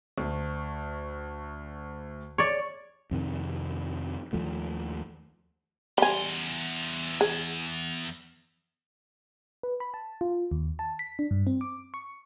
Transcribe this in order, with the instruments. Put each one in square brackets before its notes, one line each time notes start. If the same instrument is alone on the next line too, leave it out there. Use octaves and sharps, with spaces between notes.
[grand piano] D2
[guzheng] C#5 D5
[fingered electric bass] F2 C3 D#3
D#2 F3 A3
[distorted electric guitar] E2 C6 [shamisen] G3 G#5
[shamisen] G#4
[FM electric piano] B4
B5
A5
F4
D#2
A5
B6
D4
G2
C4
D6
C#6